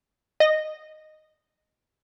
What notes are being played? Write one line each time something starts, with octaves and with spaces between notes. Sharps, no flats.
D#5 A#6